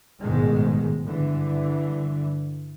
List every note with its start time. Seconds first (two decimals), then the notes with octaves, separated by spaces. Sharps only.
0.22 A1 F2 G#2 B2 D#3 G#3
1.05 G2 D3 E3